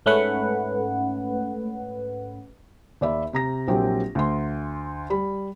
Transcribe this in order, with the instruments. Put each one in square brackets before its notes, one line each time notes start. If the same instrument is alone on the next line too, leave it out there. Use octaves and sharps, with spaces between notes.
[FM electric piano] G#2 A3 C#4 B4 F#5
[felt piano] D#2 D5 E5 B5
C3 A#5 A#6
A#1 F#3 A#3 C4 G4
D2 C6
G3 B5